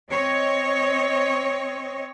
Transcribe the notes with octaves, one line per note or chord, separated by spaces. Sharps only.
C4 C#5 D#5